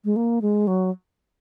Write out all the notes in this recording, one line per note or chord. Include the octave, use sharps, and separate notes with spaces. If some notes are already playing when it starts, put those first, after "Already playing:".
G#3
A#3
G#3
F#3